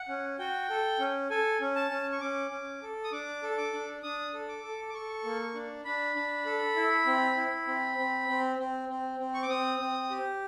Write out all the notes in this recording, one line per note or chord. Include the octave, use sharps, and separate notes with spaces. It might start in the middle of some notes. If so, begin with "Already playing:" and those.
Already playing: F#5
C#4
F#4 G5
A4
C#4
A4 G#5
C#4
A5
C#4
C#6
C#4 D6
C#4
A4
D#6
D4 D6
A4
D6
D4
D4 D#6
A4
D6
A4
D6
A4 C#6
A#3
D4
D4 B5
D4
A4
E4
C4
E4
C4
C4
C4
C4
C4
C4
C#6
D6
C4 D#6
C4
G4